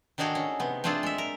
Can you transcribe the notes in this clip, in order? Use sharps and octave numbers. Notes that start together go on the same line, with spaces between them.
D#3 D4 D#4 F#4 G#4 A4
C#4
C3 B3
A3 C4 D4 F4 G#4 A4
G#3 E5
A#4